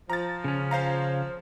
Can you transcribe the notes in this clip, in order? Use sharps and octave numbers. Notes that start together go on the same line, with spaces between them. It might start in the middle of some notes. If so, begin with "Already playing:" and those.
F3 A#5 A6
C#3 C#4
C5 F5 A#5